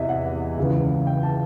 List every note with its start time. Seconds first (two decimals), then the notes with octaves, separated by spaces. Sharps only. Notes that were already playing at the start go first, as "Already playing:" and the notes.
Already playing: E2 C3 E3 D#5 E5
0.09 F#5
0.57 C#2 C#3 E3
1.07 G5
1.23 A5